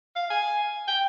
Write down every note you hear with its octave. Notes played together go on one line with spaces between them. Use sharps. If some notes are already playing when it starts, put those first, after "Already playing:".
F5
G#5
G5